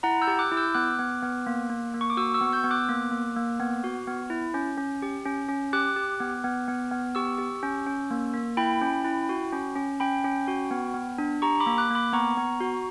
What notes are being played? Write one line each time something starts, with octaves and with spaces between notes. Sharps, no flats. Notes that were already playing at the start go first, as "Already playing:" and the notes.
E4 F#5 A#5
E6 G6
G4
D6 F#6
E4
E6 G6
B3 D6 F#6
B3
B3
A#3
A#3
A#3
C#6
D6
F#4 C#6 E6
C#6 E6
B3
E6 G6
B3
D6 F#6
A#3
A#3
A#3
B3
F#4
B3
E4
C#4
C#4
G4
C#4
C#4
G4 D6 F#6
G4
B3
B3
B3
B3
G4 C#6 E6
G4
C#4
C#4
A#3
A#3
E4 G5 B5
C#4
E4
F#4
C#4
C#4
C#4 G5 B5
C#4
F#4
B3
B3
D4
G4 A#5 C#6
B5 D6
A#3
D6 F#6
A#3 B5 D6
B3 A#5 C#6
B3
F#4